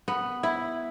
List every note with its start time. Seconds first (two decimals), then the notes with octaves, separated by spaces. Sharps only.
0.08 B3
0.43 E4